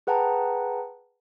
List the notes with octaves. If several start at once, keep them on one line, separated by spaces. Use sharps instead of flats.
G#4 B4 F#5 G5 A5 A#5